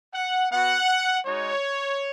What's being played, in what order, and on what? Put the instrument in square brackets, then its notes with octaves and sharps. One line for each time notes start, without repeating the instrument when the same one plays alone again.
[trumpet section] F#5
B3 F#4 F#5
G#3 D#4 F#4 C#5